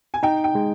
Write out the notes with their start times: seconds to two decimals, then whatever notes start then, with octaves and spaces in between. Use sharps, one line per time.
0.14 G#5
0.23 D#4 G5
0.44 G5
0.55 G#3